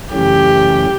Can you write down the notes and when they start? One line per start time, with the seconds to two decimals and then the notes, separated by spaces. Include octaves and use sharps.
0.12 F#2 C#3 E3 A3 C#4 G4